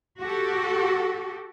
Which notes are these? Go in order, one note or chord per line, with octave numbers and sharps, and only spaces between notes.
F#4 G4 A4